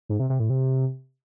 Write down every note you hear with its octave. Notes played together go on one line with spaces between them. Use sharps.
G#2
C3
C3
A2
C3